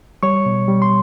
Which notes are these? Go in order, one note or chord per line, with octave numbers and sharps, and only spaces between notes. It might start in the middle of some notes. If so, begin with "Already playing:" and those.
G3 C#5 C#6
B2
G3
C6